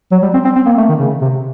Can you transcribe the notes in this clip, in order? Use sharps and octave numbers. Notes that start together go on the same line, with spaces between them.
F#3
G3
C4
C4
C4
A#3
A3
D#3
C#3
C3